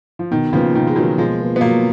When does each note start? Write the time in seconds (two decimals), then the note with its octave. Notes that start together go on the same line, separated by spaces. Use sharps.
0.19 F3
0.31 B2 D#3
0.53 C#3 F3 A#3 F4 B4
0.75 B2 D#3
0.87 G#3
0.96 D#3 F#3 A#3 F4 B4
1.18 B2 F3 G#3
1.40 A#3 F4 B4
1.56 B3
1.61 B2 F#3 A#3